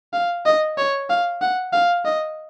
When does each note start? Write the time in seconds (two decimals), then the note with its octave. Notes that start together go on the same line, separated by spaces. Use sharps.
0.13 F5
0.46 D#5
0.78 C#5
1.10 F5
1.41 F#5
1.73 F5
2.05 D#5